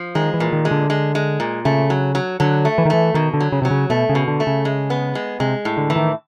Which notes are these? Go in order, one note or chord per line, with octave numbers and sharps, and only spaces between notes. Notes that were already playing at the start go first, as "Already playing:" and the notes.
Already playing: F3
D#3 G#3
E3
A#2
D#3
G#3
D3
G#3
G#3
A#2
C#3 A3
F#3
F#3
D3 F#3
A3
E3
D#3
E3 A3
B2 D#3
D3
F#3
C#3
C3 F#3
C#3
B2 A3
C#3
B2
D3
A3
C#3
G#3
B3
G#3
C3 G#3
A2
D3
E3
D#3